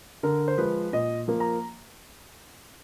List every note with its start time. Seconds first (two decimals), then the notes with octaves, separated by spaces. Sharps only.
0.23 D3 A#4
0.48 C5
0.58 F3 G#3 B4
0.93 A#2 D#5
1.28 F3 A#3
1.40 A#5